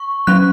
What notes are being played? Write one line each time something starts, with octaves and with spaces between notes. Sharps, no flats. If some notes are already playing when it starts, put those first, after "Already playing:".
Already playing: C#6
F#3 C#4 F#6